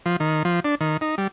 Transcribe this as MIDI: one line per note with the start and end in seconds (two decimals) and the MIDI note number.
0.06 0.16 53
0.20 0.43 51
0.45 0.60 53
0.65 0.75 62
0.81 0.97 51
1.01 1.15 63
1.18 1.28 55